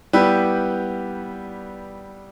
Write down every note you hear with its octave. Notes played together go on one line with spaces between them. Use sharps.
G3 B3 E4 G4 B4